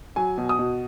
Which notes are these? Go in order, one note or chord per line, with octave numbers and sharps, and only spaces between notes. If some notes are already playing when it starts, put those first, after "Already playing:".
F#3 G#5
B2
D#6
B2